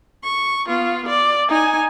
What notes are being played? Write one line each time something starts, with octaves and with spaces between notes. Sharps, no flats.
C#6
B3 F4
D5
D#4 G#5